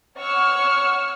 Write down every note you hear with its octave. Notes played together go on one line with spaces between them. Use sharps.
C#5 F#5 C#6 E6 F6